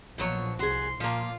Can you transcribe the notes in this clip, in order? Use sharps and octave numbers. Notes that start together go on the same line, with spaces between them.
A#1 B2 F3 F#3 C#5
C2 F#4 G#4 C6
A#2 F3 A#3 F4